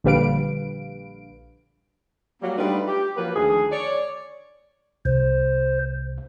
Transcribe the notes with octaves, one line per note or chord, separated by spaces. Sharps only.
A#1 D3 G3 B4 F5 D7
F#3 G3 A#3
G3 A3 D4 D#4 F4 B4
G4
F3 F#3 A#3 B4
D2 D#3 F3 G#4
C#5 D5
C2 C5